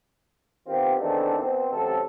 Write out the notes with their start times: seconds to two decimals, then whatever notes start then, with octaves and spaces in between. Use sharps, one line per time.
0.67 D#3 B3 C4 F4 G4
0.98 E2 D#3 E3 C4 D4 A4
1.38 B2 C4
1.72 A1 C3 F#3 A4